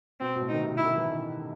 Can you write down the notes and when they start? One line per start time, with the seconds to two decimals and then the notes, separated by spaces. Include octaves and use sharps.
0.20 B2 C4
0.36 B2
0.41 A2
0.49 D#4
0.53 D#3
0.63 C3
0.77 E4
0.85 D#3
0.97 E3
1.09 D#3